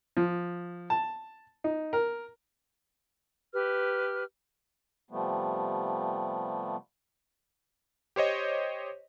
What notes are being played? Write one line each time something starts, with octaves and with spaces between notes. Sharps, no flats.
F3
A5
D#4
A#4
G4 B4 F6
C3 F3 G3 A3 B3
G4 C5 C#5 D#5